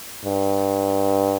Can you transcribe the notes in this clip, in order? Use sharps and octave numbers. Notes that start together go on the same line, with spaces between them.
G2